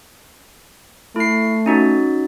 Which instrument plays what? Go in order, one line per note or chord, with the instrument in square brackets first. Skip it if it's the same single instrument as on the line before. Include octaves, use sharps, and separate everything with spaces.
[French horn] A3 [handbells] E4 C7
[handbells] C#4 D#4 F#4